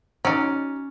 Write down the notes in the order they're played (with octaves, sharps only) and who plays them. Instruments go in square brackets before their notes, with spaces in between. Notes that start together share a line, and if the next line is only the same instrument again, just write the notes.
[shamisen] F#3 D#4 [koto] C#4 D5